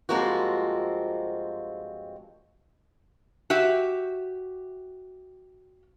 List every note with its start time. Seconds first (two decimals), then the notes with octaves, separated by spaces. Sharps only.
0.09 G2 F3 G#3 A#3 C4 F#4
3.50 F#4 G4 E5